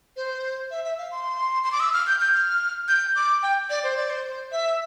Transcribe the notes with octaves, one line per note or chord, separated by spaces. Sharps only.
C5
E5
E5
F5
C6
C6
D6
E6
F6
G6
G6
F6
G6
D6
G5
D5
C5
D5
C5
E5